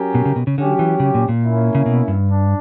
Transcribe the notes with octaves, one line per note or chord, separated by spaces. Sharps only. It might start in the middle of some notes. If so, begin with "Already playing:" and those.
Already playing: F#3 C#4 G4 A#4
B2
C#3
B2
C#3
D3 F#3 C#4 G4
E3
C#3
A#2
A#2
A#3 C#4 E4
C#3
B2
G2
D4